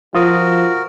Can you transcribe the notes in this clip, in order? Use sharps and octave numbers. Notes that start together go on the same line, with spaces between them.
F3 F4 F#4 A#4 D#6